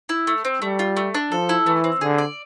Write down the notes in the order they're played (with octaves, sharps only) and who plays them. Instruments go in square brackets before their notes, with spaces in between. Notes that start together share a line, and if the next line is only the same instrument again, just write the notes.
[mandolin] E4
A3
C4
[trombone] G3 [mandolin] A3
[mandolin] F4
A3
D4
[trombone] F3 [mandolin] A4
[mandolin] E4
[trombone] E3 [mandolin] A3
[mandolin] C4
[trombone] D3 [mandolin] G#4
[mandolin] D5